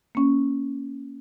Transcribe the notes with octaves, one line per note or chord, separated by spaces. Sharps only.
A#3 C#4